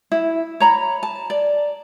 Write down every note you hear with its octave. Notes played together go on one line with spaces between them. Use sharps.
E4
C#5 A#5 B5
A5
D5